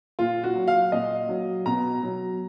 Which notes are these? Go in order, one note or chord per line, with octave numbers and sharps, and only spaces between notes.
A#2 F4
F#4
F#3
F5
A#2 D#5
F#3
B2 A#5
F#3